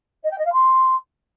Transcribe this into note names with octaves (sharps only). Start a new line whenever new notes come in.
D#5
G5
D#5
F5
C6